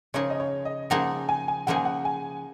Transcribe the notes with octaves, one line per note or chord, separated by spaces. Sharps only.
C#3 F3 A#3 D#4 G#4 C#5
D#5
C#5
D#5
C#3 F3 A#3 D#4 G#4 F#5
G#5
G#5
C#3 F3 A#3 D#4 G#4 F#5
G#5
F#5
G#5